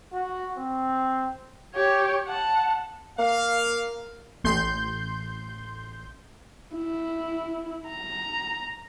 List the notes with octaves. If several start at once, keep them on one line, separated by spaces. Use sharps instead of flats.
F#4
C4
G4 C#5
F#5 A5
A#3 F5
A1 C6 G6
E4
A#5